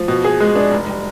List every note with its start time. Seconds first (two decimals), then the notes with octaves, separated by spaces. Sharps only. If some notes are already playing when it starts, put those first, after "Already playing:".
Already playing: F3
0.08 B2
0.24 G#4
0.40 G#3
0.56 D4
0.71 F1
0.88 G3